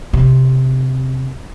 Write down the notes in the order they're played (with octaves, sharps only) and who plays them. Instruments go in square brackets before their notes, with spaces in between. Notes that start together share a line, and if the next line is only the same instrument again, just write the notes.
[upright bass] C3